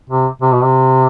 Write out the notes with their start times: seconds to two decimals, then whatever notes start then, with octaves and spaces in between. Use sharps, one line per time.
0.10 C3
0.42 C3
0.52 B2
0.62 C3